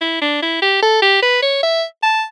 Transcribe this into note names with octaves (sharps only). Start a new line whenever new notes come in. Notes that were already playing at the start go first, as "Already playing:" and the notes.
E4
D4
E4
G4
A4
G4
B4
C#5
E5
A5